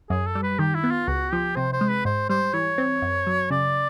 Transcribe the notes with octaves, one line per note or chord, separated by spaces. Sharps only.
F#2 G#4
A4
G3
B4
D#3 G4
E4
B3
F4
C#2 F#4
F3 G4
C3 C5
C5
G#3
B4
G#2 C5
G3 C5
E3 C#5
C4
F#2
F#3
C#3 D5